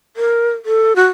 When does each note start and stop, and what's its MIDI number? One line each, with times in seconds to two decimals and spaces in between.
0.17 0.50 70
0.65 0.95 69
0.96 1.06 66